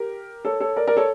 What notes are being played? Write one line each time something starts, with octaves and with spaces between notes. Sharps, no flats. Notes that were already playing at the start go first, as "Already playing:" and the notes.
Already playing: G4 A#4
A4 C#5
A4 C#5
A#4 D5
A#4 D5
A4 C#5